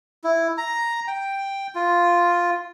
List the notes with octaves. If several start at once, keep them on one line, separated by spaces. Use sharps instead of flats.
E4
A#5
G5
F4